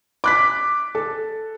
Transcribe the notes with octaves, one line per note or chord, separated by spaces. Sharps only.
D6 F#6 B6
A4